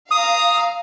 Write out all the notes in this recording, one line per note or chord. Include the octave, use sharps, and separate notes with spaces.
F5 A#5 D#6